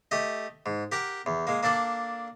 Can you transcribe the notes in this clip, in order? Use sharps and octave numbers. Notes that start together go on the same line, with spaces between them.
A3 G4 D#5
G#2
G4 A#4 F#5 G5
E2
G#3 A#3
A#3 D4 A4 D5